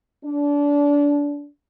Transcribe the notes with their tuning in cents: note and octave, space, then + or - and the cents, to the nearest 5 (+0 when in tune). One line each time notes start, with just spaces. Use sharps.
D4 -25